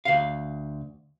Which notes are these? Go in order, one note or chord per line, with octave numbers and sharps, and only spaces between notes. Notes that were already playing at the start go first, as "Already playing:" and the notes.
D2 F5